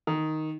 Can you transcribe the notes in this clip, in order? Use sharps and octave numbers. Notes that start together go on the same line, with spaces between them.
D#3